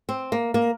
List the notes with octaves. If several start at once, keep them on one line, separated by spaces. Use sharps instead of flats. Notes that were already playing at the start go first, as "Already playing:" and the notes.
C4
A#3
A#3